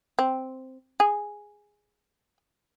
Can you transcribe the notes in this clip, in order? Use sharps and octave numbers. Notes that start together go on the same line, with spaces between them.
C4
G#4